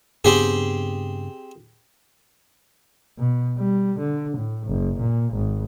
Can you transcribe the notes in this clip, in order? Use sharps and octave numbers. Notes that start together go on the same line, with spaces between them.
G2 C#3 B3 C4 G4 G#4
B2
G3
D3
A2
F#1
A#2
G#1